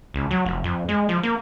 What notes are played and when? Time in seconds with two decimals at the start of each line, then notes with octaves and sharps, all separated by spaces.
0.14 C#2
0.31 F#3
0.46 F1
0.64 F2
0.89 G#3
1.09 F3
1.23 A#3